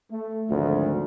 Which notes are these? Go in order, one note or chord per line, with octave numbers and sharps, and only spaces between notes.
A3
G#1 D2 F3